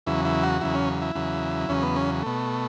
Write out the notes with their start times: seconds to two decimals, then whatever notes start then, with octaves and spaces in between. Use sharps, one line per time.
0.07 E2 C#3 F#3 E4
0.25 E4
0.43 F#4
0.61 E2 C#3 F#3 E4
0.75 C#4
1.02 E4
1.15 E2 C#3 F#3
1.69 E2 C#3 F#3 C#4
1.83 B3
1.96 C#4
2.23 B2 A3